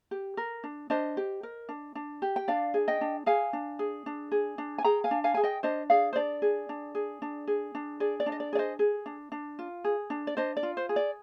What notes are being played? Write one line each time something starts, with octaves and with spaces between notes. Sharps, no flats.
G4
A#4
D4
D4 C5 D#5
G4
A#4
D4
D4
G4
G5
D4 D5 F5
G#4
D#5 G5
D4
G#4 F5 G#5
D4
G#4
D4
G#4
D4
G#5
G#4 G5 A#5
F5 G#5
D4
F5 G#5
G#4 G#5
D#5 G5
D4 C5 D#5
G#4 D5 F5
C5
D4 D5
G#4
D4
G#4
D4
G#4
D4
G#4 D5
D5
D4
D#5
D5
G#4 D5
C5 D#5
G#4
D4
D4
F4
G#4
D4
D5
D4 C5 D#5
D5
F4
C5
G#4
D5